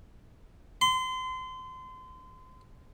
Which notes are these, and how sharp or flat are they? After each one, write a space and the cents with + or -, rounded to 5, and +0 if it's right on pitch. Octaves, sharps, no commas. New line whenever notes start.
C6 -30